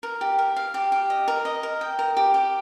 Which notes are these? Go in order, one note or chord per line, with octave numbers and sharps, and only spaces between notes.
A#4
G4
A#4
F5
G4
G4
D#5
A#4
D#5
A#4
G5
A#4
G4
G4